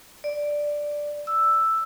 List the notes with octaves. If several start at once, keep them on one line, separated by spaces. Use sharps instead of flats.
D5
E6